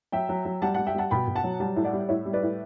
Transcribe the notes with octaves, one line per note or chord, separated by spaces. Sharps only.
F#3 E5 G5
F#3
F#3
G3 F#5 A5
G3 F#5 A5
E5 G5
G3 F#5 A5
B2 G5 B5
B2
F#5 A5
F#3
G3 F#5 A5
A2
D5 F#5
G3
A2 C#5 E5
G3
B4 D5
A2